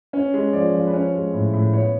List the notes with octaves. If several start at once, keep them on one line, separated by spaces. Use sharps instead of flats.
C#4
G#3
F3 D5
F3
B4
C#4 C#5
G#3
A2
A2
B3 C#5